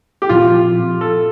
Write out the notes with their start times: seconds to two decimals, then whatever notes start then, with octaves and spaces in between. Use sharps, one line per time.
0.22 G4
0.29 A#2 F3 C4 F4
1.01 A4